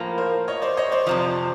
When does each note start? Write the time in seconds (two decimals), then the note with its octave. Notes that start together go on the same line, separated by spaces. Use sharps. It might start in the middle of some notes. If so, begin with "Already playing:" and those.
Already playing: A2 F3 A#3
0.18 A#4 C5
0.48 C#5 D#5
0.62 C5 D5
0.77 C#5 D#5
0.92 C5 D5
1.07 F2 C3 F3